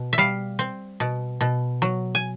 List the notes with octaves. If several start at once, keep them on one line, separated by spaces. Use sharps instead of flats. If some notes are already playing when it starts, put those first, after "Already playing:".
Already playing: B2
E5
G3 F5
C4
B2
B2
F#3
G#5